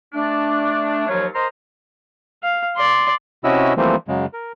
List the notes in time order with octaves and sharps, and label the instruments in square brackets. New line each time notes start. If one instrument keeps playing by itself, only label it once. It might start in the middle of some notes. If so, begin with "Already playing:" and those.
[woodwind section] A3 D4
D#2 F3 F#3 F4 C#5
A#4 C5 D#5 A#5 C6
[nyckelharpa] F5
D5 C6
[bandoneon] C3 C#4 E4 F#4 D#5 E6
E3 F3 G3 A3 A#3 C4
F#2 C#3 G#3
A#4